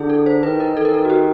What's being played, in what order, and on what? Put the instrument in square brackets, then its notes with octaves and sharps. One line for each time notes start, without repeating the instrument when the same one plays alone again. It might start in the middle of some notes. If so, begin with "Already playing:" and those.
Already playing: [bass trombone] D3 [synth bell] E4 G#4
[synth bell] A4
C5
[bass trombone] D#3 [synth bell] B4
[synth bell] A#4
[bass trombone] D#3 [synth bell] A4
[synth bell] A#4
A4
F#4
G4